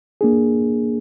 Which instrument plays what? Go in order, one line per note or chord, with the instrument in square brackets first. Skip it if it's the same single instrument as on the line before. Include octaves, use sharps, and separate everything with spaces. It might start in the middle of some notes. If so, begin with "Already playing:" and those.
[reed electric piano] A#3 D4 G#4